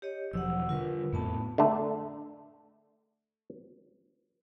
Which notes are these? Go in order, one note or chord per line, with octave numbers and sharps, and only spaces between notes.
G4 C#5 D#5
E1 F3 F#3 F#5 E6
D3 G3 F4 A#4 B4
F2 A2 A3 B3 A5
D3 A3